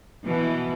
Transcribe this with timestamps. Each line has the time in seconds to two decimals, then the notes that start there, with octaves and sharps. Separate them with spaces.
0.25 B2 E3